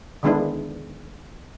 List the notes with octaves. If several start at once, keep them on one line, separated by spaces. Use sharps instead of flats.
D3 D#3 G#3 B3 D4 E4